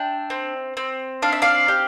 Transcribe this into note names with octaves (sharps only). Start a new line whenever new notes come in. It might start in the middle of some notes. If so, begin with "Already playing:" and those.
Already playing: D4 E5 G5
C4
C4
D4 F5
E5
D5 F5
G4